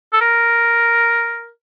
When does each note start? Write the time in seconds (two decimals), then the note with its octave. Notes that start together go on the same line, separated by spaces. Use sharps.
0.13 A4
0.21 A#4